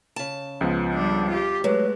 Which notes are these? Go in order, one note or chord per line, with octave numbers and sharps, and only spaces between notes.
C#3 A5
C#2 F3 B3
G3 D4
F4 G4
F#3 G#3 A3 B4